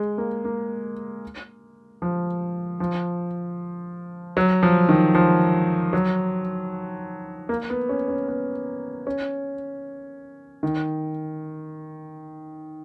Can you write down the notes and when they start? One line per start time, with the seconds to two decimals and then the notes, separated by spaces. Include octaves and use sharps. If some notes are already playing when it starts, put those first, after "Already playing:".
Already playing: G#3
0.18 A#3
0.45 A#3
2.02 F3
2.80 F3
4.37 F#3
4.63 F3
4.89 D#3
5.15 F3
5.93 F#3
7.49 A#3
7.70 B3
7.89 C#4
8.08 C#4
8.28 B3
9.07 C#4
10.63 D#3